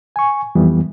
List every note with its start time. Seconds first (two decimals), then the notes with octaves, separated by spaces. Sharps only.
0.16 G#5 C#6
0.55 F2 E3 G3 B3